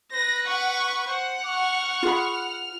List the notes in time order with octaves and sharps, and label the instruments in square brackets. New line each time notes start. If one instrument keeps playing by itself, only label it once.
[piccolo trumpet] B4 [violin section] A#6
[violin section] F#5 [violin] C#6
[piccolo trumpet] C5 [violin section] F#5
[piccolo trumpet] C#6 [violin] F6
[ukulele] F4 G#4 B5